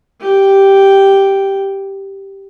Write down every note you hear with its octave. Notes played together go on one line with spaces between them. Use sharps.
G4 G5